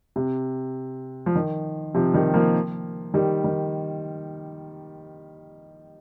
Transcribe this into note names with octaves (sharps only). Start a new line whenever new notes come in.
C3
F3
D#3
C3 F3
D#3 G3
F3 A#3
D#3 G3
D#3